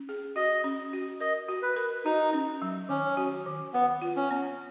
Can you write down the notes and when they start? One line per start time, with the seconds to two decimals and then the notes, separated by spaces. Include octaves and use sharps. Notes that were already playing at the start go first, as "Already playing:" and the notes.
Already playing: C#4
0.09 G#4
0.36 F#4 D#5
0.64 C#4
0.93 F#4
1.20 A#4 D#5
1.49 F#4
1.62 B4
1.76 A#4
2.05 D#4 F#4
2.33 C#4
2.62 F#3
2.89 D#3 C#4
3.17 F#4
3.46 D#3
3.74 B3 B4
4.02 F4
4.16 C#4
4.31 B3